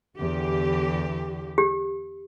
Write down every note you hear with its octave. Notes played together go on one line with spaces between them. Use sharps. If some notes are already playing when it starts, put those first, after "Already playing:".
E2 D3 G4
G4